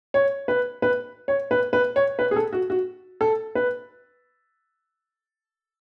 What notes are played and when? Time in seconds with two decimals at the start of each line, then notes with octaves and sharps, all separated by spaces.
0.14 C#5
0.48 B4
0.82 B4
1.28 C#5
1.51 B4
1.73 B4
1.96 C#5
2.19 B4
2.31 G#4
2.36 A4
2.53 F#4
2.70 F#4
3.21 A4
3.55 B4